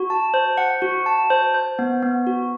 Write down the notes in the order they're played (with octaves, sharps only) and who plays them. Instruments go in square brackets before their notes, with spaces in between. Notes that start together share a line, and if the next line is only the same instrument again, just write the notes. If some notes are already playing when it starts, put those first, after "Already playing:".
Already playing: [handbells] F#4
A5
C5
F#5
F#4
A5
C5
C5
B3
B3
F#4